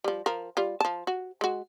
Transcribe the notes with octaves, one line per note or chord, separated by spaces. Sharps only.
F3 G3
F3 A#4
G3 F4
F3 A5
F#4
G#3 F#4